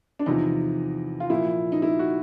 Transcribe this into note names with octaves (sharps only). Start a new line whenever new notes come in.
D4
E2 C3 F3 D#4
F4
A#2 F3 E4
D#4
E4
F#4